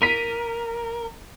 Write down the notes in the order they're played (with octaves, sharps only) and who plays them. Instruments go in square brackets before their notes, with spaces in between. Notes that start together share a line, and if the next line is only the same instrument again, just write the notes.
[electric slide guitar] A#4 [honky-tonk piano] B6 D#7